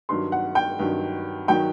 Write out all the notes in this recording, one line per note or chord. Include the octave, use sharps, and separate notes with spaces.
G2 D#3 F#3 C6
F#5
G5
G2 D#3 F#3
D#3 F#3 G5